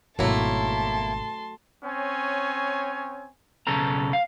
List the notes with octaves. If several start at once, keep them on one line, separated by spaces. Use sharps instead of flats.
G#1 B2 F#3 A3 A#3 E4 A5 C6
C4 C#4 C#5 G#5
B1 C#3 A4 A#5
F5